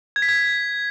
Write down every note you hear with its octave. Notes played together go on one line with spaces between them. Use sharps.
G#6
B6
G#6